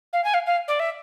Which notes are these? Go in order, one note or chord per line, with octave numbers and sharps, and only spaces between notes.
F5
G#5
F5
F5
D5
E5